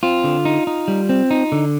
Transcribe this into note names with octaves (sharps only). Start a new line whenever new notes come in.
C4 F4
D3
D#4
D#4
G3
C4
D#4
D3